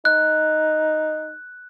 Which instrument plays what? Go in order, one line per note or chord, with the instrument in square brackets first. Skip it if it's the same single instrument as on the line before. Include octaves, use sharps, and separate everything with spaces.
[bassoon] D#4 [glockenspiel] F#6